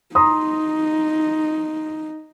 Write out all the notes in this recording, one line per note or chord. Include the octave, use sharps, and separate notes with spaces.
D#4 A#5 C6 D#6